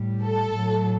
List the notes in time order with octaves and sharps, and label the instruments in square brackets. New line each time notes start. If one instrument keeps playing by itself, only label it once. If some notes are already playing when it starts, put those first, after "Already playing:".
Already playing: [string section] A2 G3
A4
A2 F#3